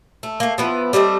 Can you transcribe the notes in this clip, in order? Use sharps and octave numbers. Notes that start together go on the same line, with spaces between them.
A3
A3 A#3
F3 B3 E4
G3 A3 C4 D#5